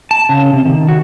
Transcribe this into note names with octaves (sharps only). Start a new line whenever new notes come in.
A5
C#3
C3
D#3
F#4